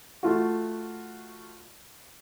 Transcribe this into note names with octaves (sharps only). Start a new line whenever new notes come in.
A3 F4 F#4